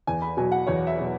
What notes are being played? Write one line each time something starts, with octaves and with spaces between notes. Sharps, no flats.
E2 G#5
B5
B2 F#3 G#5
F#5
E2 C#5
E5
B2 F#3